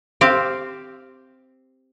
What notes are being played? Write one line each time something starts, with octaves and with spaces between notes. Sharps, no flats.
C4 G4 F5